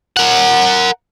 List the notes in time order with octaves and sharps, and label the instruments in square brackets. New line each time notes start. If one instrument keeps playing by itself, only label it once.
[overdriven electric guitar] A#4 F#5